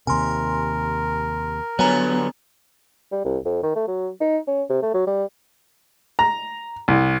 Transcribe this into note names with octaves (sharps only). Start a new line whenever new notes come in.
D#2 C3 A#4 G#5 C6
D3 F#3 B3 C#5 G#5 A#5
G3
C2
F2
D#3
A3
F#3
D#4
C#4
C3
A3
F#3
G3
A#5
C2